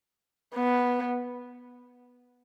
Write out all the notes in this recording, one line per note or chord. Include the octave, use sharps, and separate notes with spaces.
B3